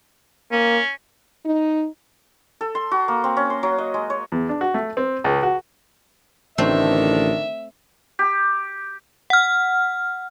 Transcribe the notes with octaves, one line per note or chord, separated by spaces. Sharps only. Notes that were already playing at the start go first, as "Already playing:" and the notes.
A#3 C#4
D#4
A4
C6
F#4
A#3
C4
C#4
C6
F#3
D#5
G#3
C#5
E2
D4
F#4
A3
C4
C#2
F#4
A1 D3 D#3 A3 C4 D4 C5 E5
G4
F#5 F6